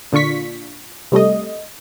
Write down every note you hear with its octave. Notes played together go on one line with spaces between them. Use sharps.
A#2 D3 D4 F4 C#6 B6
C3 G3 A3 D#5